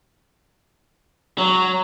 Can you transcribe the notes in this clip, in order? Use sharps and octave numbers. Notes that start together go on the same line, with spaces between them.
F#3